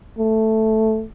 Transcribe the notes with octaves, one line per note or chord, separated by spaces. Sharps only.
A3